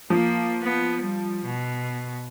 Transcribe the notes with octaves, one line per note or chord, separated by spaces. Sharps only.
F3 A#3
B3
G3
B2